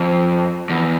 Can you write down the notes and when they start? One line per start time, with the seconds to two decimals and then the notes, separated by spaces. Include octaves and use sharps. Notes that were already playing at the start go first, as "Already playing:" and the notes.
Already playing: F2
0.70 E2